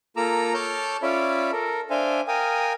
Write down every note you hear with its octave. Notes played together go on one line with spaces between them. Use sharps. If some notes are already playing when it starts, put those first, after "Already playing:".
A#3 F4 A4 A#5 D6 E6
A4 C#5 A5 D6 F6 G6
C#4 F4 C#5 D5 E5 B5
A4 A#4
D4 C5 E5 F5 G#5
A#4 F5 G5 G#5 D#6